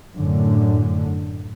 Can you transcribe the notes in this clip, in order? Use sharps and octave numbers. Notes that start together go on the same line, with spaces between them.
F#2 A2 D3